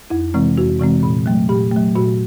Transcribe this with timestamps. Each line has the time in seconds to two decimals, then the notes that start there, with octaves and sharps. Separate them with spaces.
0.10 F2 E4
0.34 C3 E3 G#3 C4
0.58 F2 F#4
0.80 C3 E3 G#3 C4
1.03 A#2
1.26 F#3 A3
1.49 A#2 G4
1.72 F#3 A3
1.95 A#2 F#4